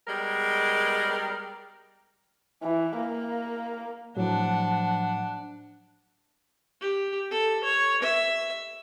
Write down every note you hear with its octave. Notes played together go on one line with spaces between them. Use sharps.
G3 G#3 B3 A#4
E3
A#3
A2 F3 F#3 D4 F#5
G4
A4
C#5
E5